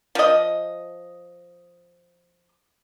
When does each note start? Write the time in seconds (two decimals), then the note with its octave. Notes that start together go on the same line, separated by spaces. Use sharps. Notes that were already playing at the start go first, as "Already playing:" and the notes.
0.15 F3 D#5